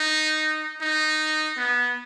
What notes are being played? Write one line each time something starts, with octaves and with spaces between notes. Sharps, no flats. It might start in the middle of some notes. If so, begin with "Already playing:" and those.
Already playing: D#4
D#4
B3